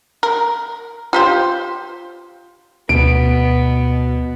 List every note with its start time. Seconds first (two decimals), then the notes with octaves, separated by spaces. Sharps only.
0.23 A#4
1.13 F4 G4 C5
2.89 D2 B2 B3 D7